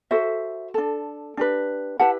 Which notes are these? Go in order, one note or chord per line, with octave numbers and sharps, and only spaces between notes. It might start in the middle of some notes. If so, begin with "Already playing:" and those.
F#4 A4 C5 E5
D4 A4
D4 G4 B4
E4 G4 B4 F#5 A5